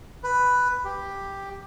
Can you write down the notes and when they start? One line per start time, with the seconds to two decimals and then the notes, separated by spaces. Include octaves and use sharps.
0.23 B4
0.85 G4